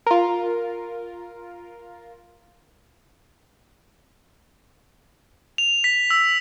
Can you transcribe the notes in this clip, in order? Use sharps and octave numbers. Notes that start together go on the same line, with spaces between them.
F4 A#4
F7
B6
E6